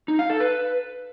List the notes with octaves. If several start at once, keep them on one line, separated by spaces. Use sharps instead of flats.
D#4
F5
A4
B4